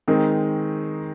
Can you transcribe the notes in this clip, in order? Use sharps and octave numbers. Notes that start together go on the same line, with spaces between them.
D#3 G#3 C4 D#4